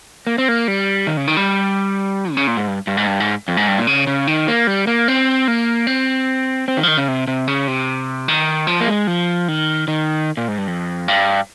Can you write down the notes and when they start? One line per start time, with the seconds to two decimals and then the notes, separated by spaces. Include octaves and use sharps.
0.27 A#3
0.38 C4
0.48 A#3
0.68 G3
1.07 D#3
1.17 C#3
1.28 D#3
1.37 G3
2.33 C3
2.37 C#3
2.47 A#2
2.57 G#2
2.68 G2
2.87 G2
2.97 G#2
3.07 G2
3.20 G#2
3.48 F2
3.57 G#2
3.68 G2
3.78 A#2
3.87 C#3
4.07 C#3
4.27 D#3
4.48 A#3
4.67 G3
4.87 A#3
5.08 C4
5.48 A#3
5.87 C4
6.68 C4
6.77 D#3
6.83 F3
6.88 D#3
6.97 C#3
7.08 C3
7.28 C3
7.48 C#3
7.67 C3
8.28 D#3
8.67 F3
8.80 A#3
8.87 G#3
9.07 F3
9.48 D#3
9.88 D#3
10.37 A#2
10.48 G#2
10.58 G2
10.67 F2
11.08 G2